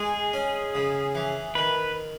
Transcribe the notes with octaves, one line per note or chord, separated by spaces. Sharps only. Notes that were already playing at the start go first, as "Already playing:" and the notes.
Already playing: G#3 G#4
C#4
C#3
E3
D#3 B4